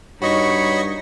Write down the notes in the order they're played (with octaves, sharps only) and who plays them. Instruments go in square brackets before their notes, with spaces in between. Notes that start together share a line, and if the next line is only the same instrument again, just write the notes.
[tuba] G2 [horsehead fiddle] D#4 [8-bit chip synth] F#4 D#5 C#6 [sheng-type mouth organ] C#5 B5